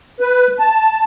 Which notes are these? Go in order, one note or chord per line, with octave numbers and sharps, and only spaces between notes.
B4
A5